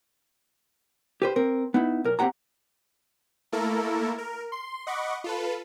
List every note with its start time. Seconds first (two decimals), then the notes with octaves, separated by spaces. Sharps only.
1.22 G4 B4 C5
1.36 C4 A#4
1.74 B3 D#4 E4
2.04 B1 A#4
2.19 C4 D#4 G4 F#5 A#5
3.52 A3 A#3 E4 A4 A#4
4.18 A#4
4.52 C6
4.87 D#5 F#5 B5 C#6 D6
5.24 F4 A4 B4